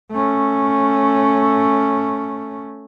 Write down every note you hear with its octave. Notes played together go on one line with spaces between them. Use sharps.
A3 C#4